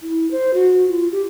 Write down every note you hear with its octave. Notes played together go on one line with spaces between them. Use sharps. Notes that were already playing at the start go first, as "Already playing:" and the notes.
E4
C5
F#4
F4
G4